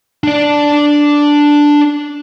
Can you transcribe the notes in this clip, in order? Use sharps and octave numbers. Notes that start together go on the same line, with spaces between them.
D4 D5